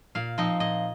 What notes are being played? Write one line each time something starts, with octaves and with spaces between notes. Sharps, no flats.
A#2 F5
F3 C4 D#4 D#5
A#2 D#5